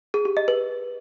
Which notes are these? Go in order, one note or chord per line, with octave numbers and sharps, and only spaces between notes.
G#4
G4
D#5
B4